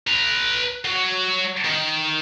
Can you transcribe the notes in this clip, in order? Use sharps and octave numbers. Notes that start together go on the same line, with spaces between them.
B4 A#5
F#3
D#3